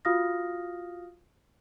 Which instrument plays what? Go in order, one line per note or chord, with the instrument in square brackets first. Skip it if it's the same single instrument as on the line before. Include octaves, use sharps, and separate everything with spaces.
[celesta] F4 F#4 F5 D#6 F6 A#6